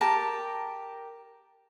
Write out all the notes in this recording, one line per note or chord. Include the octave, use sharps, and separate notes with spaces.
G4 A#4 A5